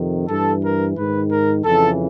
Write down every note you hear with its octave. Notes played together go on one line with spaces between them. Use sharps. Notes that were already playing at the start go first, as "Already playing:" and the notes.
Already playing: F2 C3 D#3
G2 E3 A4
A#4
G#2 D#3 B4
A#4
F2 C#3 E3 A4